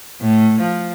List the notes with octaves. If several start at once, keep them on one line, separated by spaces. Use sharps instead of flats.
A2
F3